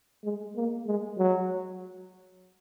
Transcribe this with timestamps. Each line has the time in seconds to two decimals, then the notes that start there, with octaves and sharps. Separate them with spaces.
0.24 G#3
0.56 A#3
0.86 G#3
1.18 F#3